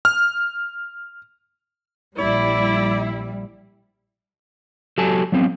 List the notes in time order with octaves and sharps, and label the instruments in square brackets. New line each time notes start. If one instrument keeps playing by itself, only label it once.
[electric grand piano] F6
[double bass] A#1 [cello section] G3 [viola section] E4 [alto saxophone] D5
[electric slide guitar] F#3 G4 A4 G#5 A5
F#3 B3 C4